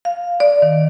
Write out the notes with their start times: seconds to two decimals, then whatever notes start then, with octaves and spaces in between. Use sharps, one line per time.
0.05 F5
0.40 D5
0.62 D#3